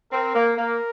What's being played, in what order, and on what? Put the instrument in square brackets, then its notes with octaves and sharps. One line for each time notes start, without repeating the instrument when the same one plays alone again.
[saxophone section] C4 [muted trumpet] A#4
[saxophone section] A#3
[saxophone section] A#3 [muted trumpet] A#4